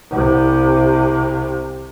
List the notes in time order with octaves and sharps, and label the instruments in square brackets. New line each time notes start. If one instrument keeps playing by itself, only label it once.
[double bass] C2 C3